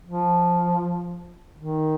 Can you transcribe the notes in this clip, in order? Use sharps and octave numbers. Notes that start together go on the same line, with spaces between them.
F3
D#3